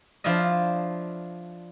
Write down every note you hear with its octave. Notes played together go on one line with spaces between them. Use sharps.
F3 D4 E4 F4 D#5